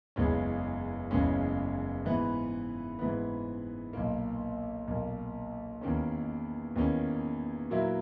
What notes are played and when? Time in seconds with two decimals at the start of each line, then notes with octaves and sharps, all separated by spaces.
0.16 F#1 E2 C#3 G#3 C#4
1.11 F#1 E2 C#3 G#3 C#4
2.05 G#2 E3 B3
2.99 G#2 E3 B3
3.93 B1 A#2 A#3
4.88 B1 A#2 A#3
5.81 E2 D#3 A#3 C#4
6.76 E2 D#3 A#3 C#4
7.70 A#2 F#3 A#3 E4